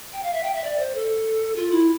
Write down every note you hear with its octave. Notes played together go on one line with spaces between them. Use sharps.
G5
F5
E5
G5
E5
D5
C5
A4
F4
E4